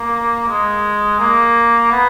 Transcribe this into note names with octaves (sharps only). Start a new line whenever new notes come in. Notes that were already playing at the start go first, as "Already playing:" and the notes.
Already playing: A#3
G#3
A#3
B3